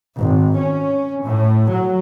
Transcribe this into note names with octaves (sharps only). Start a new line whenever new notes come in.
G#1
C#4
A2
F#3